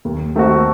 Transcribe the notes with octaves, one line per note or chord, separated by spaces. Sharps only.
D#2
D#3 A3 C4 F#4